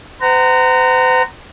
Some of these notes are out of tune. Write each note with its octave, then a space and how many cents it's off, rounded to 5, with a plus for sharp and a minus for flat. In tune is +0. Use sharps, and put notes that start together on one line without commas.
C5 -40 F#5 +25 A#5 -20